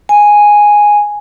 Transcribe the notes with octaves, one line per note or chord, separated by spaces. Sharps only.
G#5